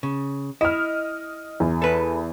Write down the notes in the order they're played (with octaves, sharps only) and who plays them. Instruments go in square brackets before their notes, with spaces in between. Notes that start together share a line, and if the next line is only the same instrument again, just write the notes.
[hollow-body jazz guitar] C#3
[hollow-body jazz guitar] E4 [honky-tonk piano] D#5 F6
[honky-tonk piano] E2
[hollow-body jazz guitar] A4 B4